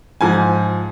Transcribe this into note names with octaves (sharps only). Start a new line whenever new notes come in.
G#2 F3 G#5